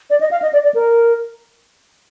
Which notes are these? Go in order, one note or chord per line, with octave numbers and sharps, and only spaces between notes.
D5
D#5
F5
D#5
D5
D5
A#4